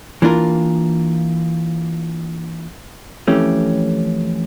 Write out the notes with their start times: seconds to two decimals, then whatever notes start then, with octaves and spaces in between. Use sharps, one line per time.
0.22 E3 A#3 D4 F4 A#4
3.28 F2 E3 A3 C#4 G4